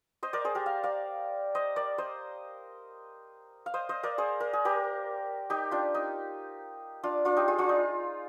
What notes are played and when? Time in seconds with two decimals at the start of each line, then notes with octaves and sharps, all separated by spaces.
0.23 C5 D#5
0.33 A#4 D5
0.45 G#4 C5
0.55 G4 A#4
0.66 F5
0.83 D5 F5
1.55 C5 D#5
1.76 A#4 D5
1.98 C5 D#5
3.66 F5
3.74 C5 D#5
3.89 C5 D#5
4.03 A#4 D5
4.18 G#4 C5
4.40 A#4
4.53 G#4
4.65 G4 A#4
5.50 D#4 G4
5.71 D4 F4
5.94 D#4
7.03 D4 F4
7.25 D4 F4
7.36 D#4 G4
7.48 F4 G#4
7.58 D4 F4
7.69 D#4